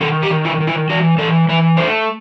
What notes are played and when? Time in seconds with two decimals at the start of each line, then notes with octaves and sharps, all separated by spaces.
0.01 D#3 A4
0.23 G4
0.30 D#3
0.45 E4
0.60 D#3
0.67 E4
0.90 E3 F#4
1.18 E3 A4
1.49 E3 B4
1.77 A3 C5